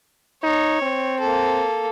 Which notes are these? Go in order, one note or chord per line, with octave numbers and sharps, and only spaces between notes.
D#4 C#5
C4
A#3 A4